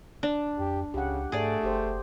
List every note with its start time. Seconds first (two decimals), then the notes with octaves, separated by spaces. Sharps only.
0.23 D4
0.59 F2 G4
0.94 C#2 C#3 G4 F#5
1.32 G#2 A3 G#4 D5
1.63 F#1 G4 C5